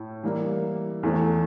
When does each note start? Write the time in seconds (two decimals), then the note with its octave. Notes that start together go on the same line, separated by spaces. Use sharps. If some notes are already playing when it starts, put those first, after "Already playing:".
Already playing: A2
0.23 E3 G3 A#3
1.03 E2 E3 A3 C4